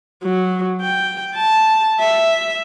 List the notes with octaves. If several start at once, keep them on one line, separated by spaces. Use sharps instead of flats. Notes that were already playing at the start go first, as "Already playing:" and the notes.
F#3
G5
A5
E5